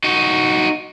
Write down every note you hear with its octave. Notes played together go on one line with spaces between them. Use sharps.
D#4 F#4